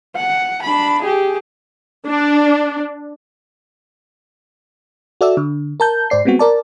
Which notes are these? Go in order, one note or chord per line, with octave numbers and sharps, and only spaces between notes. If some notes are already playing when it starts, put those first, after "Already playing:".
F#5
D4 B5
G4 G#4
D4
F#4 A4 D5 E5 E6
D3
A#4 A5 G6
G#2 C5 D5 C7
G3 G#3 B3 C4 F#4
A#4 D5 A5